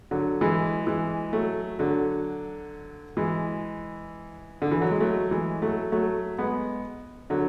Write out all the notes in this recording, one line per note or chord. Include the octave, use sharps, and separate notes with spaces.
D3 F#3
E3 G#3
E3 G#3
F#3 A3
D3 F#3
E3 G#3
D3
E3
F#3
G#3
F#3 A3
E3 G#3
F#3 A3
F#3 A3
G#3 B3
D3 F#3